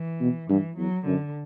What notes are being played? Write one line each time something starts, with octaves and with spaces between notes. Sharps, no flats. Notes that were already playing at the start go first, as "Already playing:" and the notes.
Already playing: E3
B2
G2 E3
E2 F#3
F#2 D3